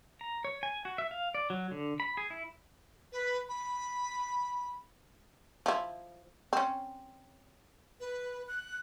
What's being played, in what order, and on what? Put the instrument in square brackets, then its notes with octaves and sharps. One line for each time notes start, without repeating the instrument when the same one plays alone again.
[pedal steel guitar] A#5
C#5
G#5
F#4
E5
F5
D5
F#3
D3
B5
G#4
E4
[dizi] B4
B5
[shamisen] F3 E4
C4 C#4
[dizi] B4
F#6